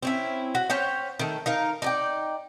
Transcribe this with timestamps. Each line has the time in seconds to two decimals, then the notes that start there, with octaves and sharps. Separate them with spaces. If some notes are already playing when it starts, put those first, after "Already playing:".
0.03 C4 C#4 E4
0.55 F#4
0.70 C#4 C5 C#5 G5
1.19 D#3 A3
1.46 D#4 A#4 F5
1.82 D#4 D5 G5